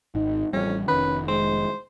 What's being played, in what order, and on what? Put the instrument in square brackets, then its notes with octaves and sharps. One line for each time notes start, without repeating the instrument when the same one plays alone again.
[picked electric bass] G#1 [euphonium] D#4
[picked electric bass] A1 G3 [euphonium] F2 [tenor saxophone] C#4
[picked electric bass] F1 D#3 [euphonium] C#4 [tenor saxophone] B4
[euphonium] G#3 [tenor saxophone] C5